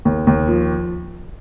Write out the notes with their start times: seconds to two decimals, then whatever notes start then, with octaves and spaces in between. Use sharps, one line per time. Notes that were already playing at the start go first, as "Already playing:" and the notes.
0.05 D#2
0.27 D#2
0.48 F3